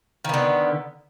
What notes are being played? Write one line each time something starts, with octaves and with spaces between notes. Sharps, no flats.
D3 D#3 B3